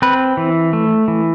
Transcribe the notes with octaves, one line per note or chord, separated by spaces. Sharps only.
C4 B4
E3
A3
E3